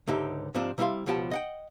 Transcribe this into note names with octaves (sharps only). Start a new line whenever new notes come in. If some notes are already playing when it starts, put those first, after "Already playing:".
C#2 G#2 D3 D#4 G4 E5
G#2 C3 F3 C4 D4
C3 G3 E4 C5 F5 C6
C#2 B2 F3 G4 F#5 A5
D#5 F#5 G5